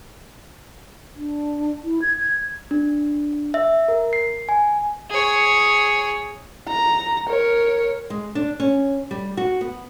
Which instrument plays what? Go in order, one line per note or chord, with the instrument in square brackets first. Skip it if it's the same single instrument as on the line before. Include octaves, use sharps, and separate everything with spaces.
[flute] D4
E4
G#6
G#6
[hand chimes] D4
E5
A#4
C7
G#5
[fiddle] G#4 C#5
[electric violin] A#5
A#4 C#5
[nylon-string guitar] G#3
D4
C#4
G3
F#4
B3